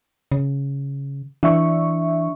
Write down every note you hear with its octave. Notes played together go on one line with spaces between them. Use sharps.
C#3
E3 D4 E5 C#6